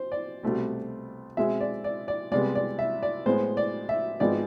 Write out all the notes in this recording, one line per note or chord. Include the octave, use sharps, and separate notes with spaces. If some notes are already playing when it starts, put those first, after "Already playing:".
Already playing: C5
D5
C2 B2 A3 C4
B2 G#3 C4 E5
D5
D5
D5
C2 C3 G#3 B3 D5
D5
E5
D5
A2 G#3 B3 C5
D5
E5
G#1 G#2 F3 B3 D5